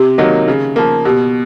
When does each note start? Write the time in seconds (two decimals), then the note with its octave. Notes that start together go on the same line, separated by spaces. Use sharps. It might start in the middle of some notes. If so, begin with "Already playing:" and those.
Already playing: C3 G4
0.18 D#3 F#3 A#3 D#4
0.48 C#3
0.76 F3 A#3
1.05 B2 G4